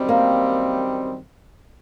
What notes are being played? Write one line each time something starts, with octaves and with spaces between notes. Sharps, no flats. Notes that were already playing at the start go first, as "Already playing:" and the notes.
Already playing: F#2 D#3 G3 C4
A#3